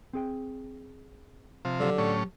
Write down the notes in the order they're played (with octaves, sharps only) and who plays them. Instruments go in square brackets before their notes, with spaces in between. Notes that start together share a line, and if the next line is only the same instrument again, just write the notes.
[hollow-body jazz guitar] C4 G#4 G5
[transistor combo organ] C3 F3
[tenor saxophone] D3 [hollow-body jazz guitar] F#3 G4
[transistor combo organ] A2 C#4